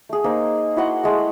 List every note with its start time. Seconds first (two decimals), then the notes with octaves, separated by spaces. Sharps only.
0.09 A3 G#4
0.24 A#3 D#4 C5
0.76 E4 F#4 F#5 C6
1.04 G#3 A3